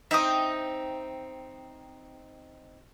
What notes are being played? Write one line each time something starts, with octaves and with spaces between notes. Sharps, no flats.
C4 D#4 E5 G5 D#6